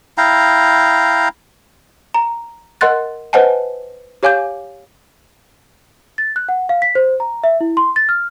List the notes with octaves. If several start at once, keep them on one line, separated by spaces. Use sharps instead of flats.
E4 F5 G5 A#5
A#5
A#4 D#5 F#5 C6 F#6 A6
B4 C5 D#5 F#5 G#5 A5
G4 C#5 F5 G#5 D6 G6
A6
F#6
F#5
F5
B6
C5
A#5
E5
E4
C6
A6
F6